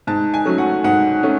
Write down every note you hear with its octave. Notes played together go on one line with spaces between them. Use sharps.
G#2 A5
G#5
F#3 A3 C#4
F#5
G#2 F#5
A3 C#4